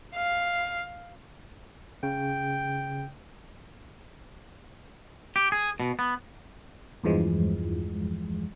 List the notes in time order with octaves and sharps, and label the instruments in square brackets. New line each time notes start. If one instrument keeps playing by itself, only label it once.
[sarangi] F5
[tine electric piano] C#3 [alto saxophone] G5
[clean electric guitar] G4
G#4
B2
B3
[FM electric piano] E2 G2 E3 F3 G#3